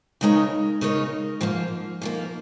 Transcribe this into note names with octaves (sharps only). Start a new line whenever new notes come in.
C#3 G#3 D#4 A#4 C#5
C#3 G#3 D#4 A#4 C#5
G#2 F3 A#3
G#2 F3 A#3